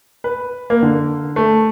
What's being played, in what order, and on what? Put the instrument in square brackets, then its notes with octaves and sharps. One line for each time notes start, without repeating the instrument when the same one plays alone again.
[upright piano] B4
A#3
D3
A3